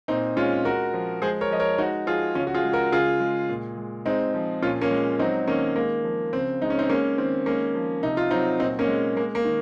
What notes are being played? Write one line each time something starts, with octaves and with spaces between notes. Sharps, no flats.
A#2 C4 D#4
G#3 C#4 F4
G#3 F#4 A#4
F3
G#3 G#4 C5
A#4 C#5
F3 D#5
A#4 C#5
G#3 D#4 F#4
F3 F4 G#4
C#3 C#4 F4
F#4
F4 G#4
G#3
F#4 A#4
C#3 F4 G#4
G#3
A#2
G#3
G#3 C4 D#4
F3
A#2 C#4 F4
A#3 C#4
G#3
F#3 C4 D#4
D#3 A#3 C#4
G#3 A#3
F3
C#3 C4
G#3 D#4
C#4
C4 D#4
G#3 A#3 C#4
D#3 C4
G#3 A#3 C#4
F3
C3 D#4
F4
F#3 C4 D#4
A#2 C4 D#4
A#3 C#4
G#3
G#3 A#3
A#3
D#3